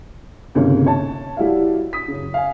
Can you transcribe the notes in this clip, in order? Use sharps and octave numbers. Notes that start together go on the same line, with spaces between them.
G1 C#2 C3 D#3 A#3 C#5
C#5 A5
G3 E4 F#4 E5 F5
D#6 B6
F#2 C#3
F5 G#5